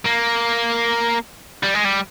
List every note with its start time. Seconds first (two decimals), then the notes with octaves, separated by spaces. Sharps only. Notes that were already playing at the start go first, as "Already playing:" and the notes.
0.05 A#3
1.64 G3
1.75 G#3
1.85 G3